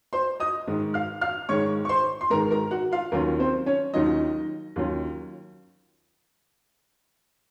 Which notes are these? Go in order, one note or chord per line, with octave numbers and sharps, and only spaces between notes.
C5 C6
D#5 D#6
G#2 D#3 G#3
F5 F6
F5 F6
G#2 D#3 G#3 C#5 C#6
C#6
C5 C6
C6
G#2 D#3 G#3 A#4 A#5
A#4 A#5
F#4 F#5
F4 F5
D#2 D#3 F#3 C#4 F4 A#4
C4 C5
C#4 C#5
D#2 D#3 F#3 C#4 D#4 F4 D#5
D#2 D#3 F#3 C#4 F4